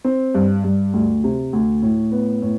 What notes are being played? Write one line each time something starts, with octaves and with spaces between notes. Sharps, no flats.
C4
G2
G2
D2
C3
D2
A2
B3
A2